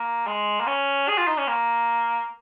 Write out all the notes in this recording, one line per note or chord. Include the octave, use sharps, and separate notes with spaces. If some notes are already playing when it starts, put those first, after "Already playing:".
Already playing: A#3
G#3
A#3
C#4
G#4
F4
D#4
C#4
A#3